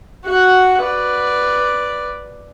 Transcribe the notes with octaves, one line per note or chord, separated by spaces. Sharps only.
F#4 F#5
B4 D5